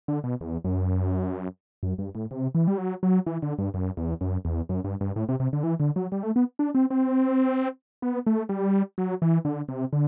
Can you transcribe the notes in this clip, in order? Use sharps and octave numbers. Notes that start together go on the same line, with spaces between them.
D3
B2
E2
F#2
F#2
G2
A2
C3
E3
G3
F#3
F#3
E3
D3
G2
F#2
E2
F#2
E2
F#2
G2
G2
A2
C3
C3
D3
E3
D3
F#3
G3
A3
B3
D4
C4
C4
B3
A3
G3
F#3
E3
D3
C3
D3